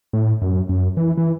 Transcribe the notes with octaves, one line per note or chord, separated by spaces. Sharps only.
A2
F#2
F#2
E3
E3